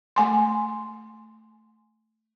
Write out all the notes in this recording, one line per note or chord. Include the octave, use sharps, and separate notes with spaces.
A3 G#5 C6